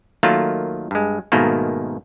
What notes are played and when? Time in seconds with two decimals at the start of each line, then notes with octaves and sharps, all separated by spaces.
0.23 D#3 F#3 A3 A#3 F4
0.91 G2 G#3
1.32 G#2 B2 D#3 A3 A#3